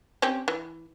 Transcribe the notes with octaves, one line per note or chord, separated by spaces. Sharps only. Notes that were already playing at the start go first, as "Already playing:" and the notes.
C4 C#4 G4
E3